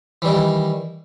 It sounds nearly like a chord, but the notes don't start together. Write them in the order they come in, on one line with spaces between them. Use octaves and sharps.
E3 G3 D#3